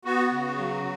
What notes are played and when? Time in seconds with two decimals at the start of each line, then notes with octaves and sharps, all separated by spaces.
0.05 B3 F#4
0.31 C#3
0.58 F#3